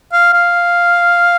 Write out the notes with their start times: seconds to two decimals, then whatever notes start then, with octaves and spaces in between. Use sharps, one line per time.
0.13 F5
0.33 F5